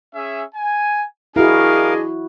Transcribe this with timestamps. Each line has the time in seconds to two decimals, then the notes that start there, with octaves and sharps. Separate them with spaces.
0.14 C#4 G#4 E5
0.55 G#5
1.36 D4 E4 F#4 G#4 A#4 D#5 F5 G#5